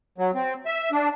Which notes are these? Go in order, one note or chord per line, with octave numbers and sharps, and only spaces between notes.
F#3
C4
E5
D4